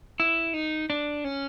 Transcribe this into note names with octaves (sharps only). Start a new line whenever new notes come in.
E4
D#4
D4
C#4